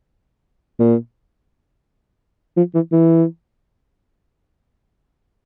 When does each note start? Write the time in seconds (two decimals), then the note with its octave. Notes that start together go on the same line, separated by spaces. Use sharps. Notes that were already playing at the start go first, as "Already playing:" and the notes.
0.79 A#2
2.57 F3
2.75 E3
2.92 E3